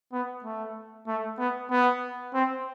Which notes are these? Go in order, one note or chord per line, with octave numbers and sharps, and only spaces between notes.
B3
A3
A3
B3
B3
C4